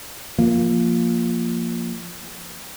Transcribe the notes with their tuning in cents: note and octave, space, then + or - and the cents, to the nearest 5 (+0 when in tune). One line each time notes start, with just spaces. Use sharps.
F3 +0 A#3 +0